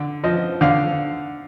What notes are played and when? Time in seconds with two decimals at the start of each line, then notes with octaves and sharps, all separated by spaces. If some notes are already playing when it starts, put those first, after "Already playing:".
Already playing: D3
0.24 F3 D#5
0.61 D3 F5